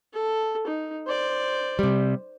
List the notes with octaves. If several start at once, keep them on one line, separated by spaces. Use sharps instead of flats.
A4
D#4
C5 D5
C3 G3